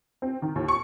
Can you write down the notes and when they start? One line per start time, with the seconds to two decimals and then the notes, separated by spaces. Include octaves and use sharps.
0.22 C4
0.42 D#3
0.56 D#2
0.68 C#6